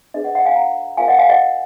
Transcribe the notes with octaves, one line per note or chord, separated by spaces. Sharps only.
D4 G#4 B4 D#5
D#5 F#5
D#5 F#5
F5 G#5
F#5 A#5
F4 A#4 F5 G#5
D#5 F#5
F5 G#5
D#5 F#5